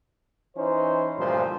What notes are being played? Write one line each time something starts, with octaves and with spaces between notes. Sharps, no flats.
E3 C#4 D#4 C5
D2 G2 A#2 F3 C5